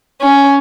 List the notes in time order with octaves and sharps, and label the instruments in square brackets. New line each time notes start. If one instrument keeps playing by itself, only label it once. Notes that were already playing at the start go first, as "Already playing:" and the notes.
[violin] C#4